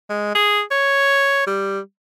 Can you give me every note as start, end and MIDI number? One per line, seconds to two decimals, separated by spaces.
0.10 0.31 56
0.35 0.61 68
0.71 1.46 73
1.47 1.79 55